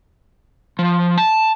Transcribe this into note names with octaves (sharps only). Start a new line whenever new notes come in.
F3
A5